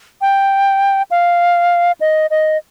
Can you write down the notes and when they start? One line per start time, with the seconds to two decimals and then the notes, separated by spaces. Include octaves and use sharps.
0.21 G5
1.11 F5
2.01 D#5
2.30 D#5